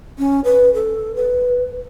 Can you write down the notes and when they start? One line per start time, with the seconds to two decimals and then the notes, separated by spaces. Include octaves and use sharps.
0.19 C#4
0.45 B4
0.74 A4
1.16 B4